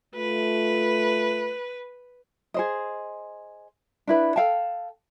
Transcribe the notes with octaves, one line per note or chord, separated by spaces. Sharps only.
A3 F4 B4
G#4 C5 D#5
D4 E4 B4
A4 F5 G5 A5